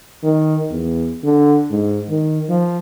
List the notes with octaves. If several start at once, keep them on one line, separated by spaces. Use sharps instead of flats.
D#3
E2
D3
G#2
D#3
F3